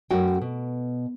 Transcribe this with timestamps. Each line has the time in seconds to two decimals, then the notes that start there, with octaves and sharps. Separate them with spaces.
0.11 F#2 A3 C#4 F#4 G5
0.42 B2